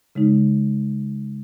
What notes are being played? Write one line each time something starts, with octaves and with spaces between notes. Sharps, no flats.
C#3 G#3 D#4